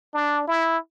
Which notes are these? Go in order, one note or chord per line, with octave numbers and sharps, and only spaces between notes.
D4
E4